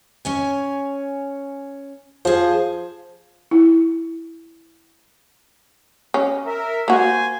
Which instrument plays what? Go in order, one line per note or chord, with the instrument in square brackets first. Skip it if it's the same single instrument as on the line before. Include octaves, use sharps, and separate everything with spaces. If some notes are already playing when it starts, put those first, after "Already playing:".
[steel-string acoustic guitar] C#4 C#5 G#5
[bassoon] F3 [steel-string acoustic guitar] G#4 C5
[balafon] E4
[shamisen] C#4
[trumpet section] A#4 E5
[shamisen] A#3 F#4 [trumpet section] C5 G#5